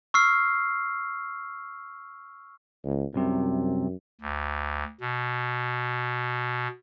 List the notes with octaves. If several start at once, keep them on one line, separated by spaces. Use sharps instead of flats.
C#6 E6 F6 C7
C#2
C2 F#2 C3
D2
B2